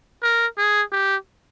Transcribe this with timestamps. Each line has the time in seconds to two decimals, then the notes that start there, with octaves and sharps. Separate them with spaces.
0.23 A#4
0.58 G#4
0.92 G4